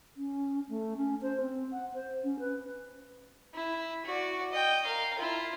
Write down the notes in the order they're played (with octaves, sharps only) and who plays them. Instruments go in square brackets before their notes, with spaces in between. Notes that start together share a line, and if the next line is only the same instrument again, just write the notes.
[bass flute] C#4
A3
C#4
C5
C4
F#5
C5
C#4
B4
[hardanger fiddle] E4
F#4 D5
D#5 G5
A#4 F5
E4 F4